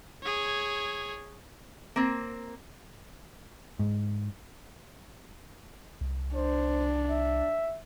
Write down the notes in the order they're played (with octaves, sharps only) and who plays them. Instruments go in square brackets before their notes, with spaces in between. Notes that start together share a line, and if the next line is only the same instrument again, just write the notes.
[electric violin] G#4 C#5
[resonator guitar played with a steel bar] A#3 C4
[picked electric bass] G#2
[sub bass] C2
[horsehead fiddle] D4 [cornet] C5
[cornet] E5